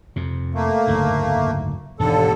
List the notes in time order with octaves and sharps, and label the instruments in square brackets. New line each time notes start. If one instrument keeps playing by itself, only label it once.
[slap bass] F2 C3
[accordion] A3 A#3
[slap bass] F#1 D2 G#2
[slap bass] E1 G#2 [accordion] D#2 D3 A4